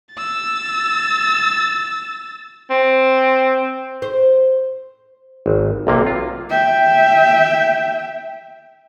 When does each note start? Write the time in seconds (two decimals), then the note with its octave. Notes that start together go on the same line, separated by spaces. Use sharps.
0.14 E6 A6
2.70 C4
4.02 C5
5.46 G#1
5.87 B1 C3 A#3
6.07 F4
6.50 E5 G5